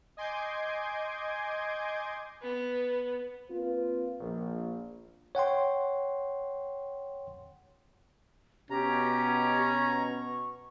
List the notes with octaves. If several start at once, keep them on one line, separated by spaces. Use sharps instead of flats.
D#5 G#5 C6 D6 G6 G#6
B3
A#3 C4 F4 B4
A#1
C#5 F#5 G5 C6
B2 C#4 G4 A#5
C#6